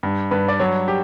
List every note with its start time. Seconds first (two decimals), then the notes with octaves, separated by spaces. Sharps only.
0.03 G2
0.31 G2 B4
0.48 D5
0.60 F#3 C#5
0.88 G4